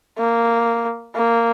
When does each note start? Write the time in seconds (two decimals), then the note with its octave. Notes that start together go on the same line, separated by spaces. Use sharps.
0.18 A#3
1.15 A#3